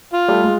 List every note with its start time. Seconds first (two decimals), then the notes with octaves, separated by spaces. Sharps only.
0.13 F4
0.29 G3 A3
0.44 G#3